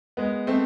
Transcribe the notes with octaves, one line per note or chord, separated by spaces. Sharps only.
G#3 B3
A3 C4